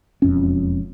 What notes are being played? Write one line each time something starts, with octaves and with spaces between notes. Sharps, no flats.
E1 F2 C#4